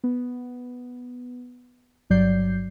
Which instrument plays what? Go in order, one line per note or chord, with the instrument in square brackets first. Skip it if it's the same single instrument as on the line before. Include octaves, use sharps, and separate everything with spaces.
[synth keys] B3
G1 G2 F#3 D5 G6 C7